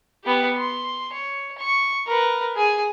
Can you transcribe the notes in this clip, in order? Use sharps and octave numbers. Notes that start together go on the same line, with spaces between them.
B3 G4
C6
C#5
C#6
A#4 B4
G#4 G#5